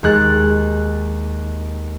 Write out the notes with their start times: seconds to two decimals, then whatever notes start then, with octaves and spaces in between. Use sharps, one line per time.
0.03 D#2 G#3 F#6 A6